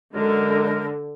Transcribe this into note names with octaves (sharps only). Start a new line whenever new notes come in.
F#2 D3 G#3 A#4